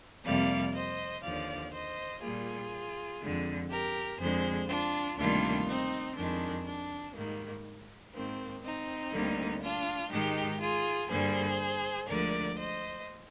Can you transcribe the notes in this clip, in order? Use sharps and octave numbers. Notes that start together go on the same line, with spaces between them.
F2 C3 G3 A#3 D5 F5
C5 D#5
D#2 D3 F3 D5 F5
C5 D#5
A#2 G3 A#3 F4 G#4
F2 D3 G#3
G4 A#4
F2 D3 G#3 G#4 C5
D4 F4
D2 C3 D#3 G3 A#3 D4 F4
C4 D#4
F2 D#3 G#3 D4
D4
G#2 D#3 G3 A#3
G#2 D#3 A#3 C4
C4 D#4
D2 D3 G3 A#3
D4 F4
G#2 D#3 G#3 D#4 G4
F4 G#4
G2 D3 G3 A#3 G#4 C5
D2 D3 F3 G#3 A#4 D5
C5 D#5